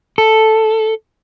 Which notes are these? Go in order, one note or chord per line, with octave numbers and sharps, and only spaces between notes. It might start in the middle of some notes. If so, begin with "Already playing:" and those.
A4